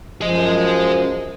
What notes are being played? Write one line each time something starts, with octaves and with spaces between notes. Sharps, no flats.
F#2 F3 G#4 D#5